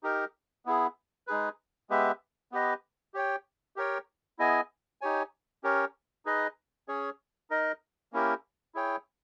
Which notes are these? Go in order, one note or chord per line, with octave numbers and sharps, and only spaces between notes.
D#4 G4 A#4
B3 E4 G#4
G#3 D#4 G#4 B4
G#3 B3 G4 B4 E5
B3 G4 B4 D#5
G4 C#5 G5
G4 A#4 C#5 G5
B3 E4 G#4 D#5 G#5
D#4 G4 C#5 G#5
C#4 G4 A#4 C#5
D#4 G#4 B4 D#5
C#4 G#4 C#5
D#4 A#4 D#5
A#3 C#4 E4 G4 A#4
E4 G#4 C#5 G5